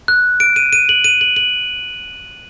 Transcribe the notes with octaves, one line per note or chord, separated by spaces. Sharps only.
F#6
D7
D#7
D#7
F#7
D#7
F#7
F#7